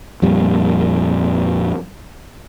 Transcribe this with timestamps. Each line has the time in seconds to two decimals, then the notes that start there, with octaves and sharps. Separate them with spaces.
0.22 F2 A#2 G3